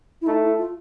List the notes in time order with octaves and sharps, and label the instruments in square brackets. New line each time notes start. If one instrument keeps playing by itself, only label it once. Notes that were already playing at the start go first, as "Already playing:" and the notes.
[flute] E4
[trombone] A3 [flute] D#4
[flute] E4
F4